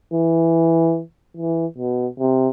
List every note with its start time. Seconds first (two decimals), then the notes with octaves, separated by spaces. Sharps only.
0.13 E3
1.37 E3
1.78 B2
2.20 C3